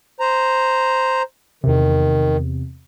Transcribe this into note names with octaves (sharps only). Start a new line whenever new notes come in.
C5 A#5
E2 C3 D#3